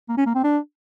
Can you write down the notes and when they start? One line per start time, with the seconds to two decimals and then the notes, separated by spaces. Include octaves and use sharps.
0.09 A#3
0.17 C#4
0.26 A#3
0.35 C4
0.44 D4